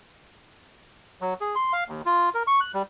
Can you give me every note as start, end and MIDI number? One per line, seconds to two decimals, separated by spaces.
1.21 1.34 54
1.41 1.55 68
1.55 1.73 84
1.73 1.84 77
1.88 2.02 39
2.06 2.29 65
2.34 2.43 70
2.47 2.60 85
2.60 2.72 90
2.74 2.83 55